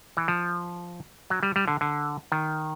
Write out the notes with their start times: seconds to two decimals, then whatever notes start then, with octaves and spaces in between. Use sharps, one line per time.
0.17 E3
0.28 F3
1.30 F#3
1.43 G3
1.56 G3
1.68 D3
1.81 D3
2.32 D#3